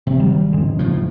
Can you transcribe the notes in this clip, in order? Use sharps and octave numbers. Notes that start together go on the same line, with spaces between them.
G#1 C3
F#3 G3
E2 C#3 G#3
F#1 A2 F3